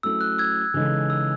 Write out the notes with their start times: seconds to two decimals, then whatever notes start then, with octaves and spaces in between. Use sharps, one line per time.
0.03 F#3 A3 C#4 E4 A4 E6
0.21 F#6
0.38 E6 G#6
0.74 C#3 E3 G#3 D#4 A4
1.10 E6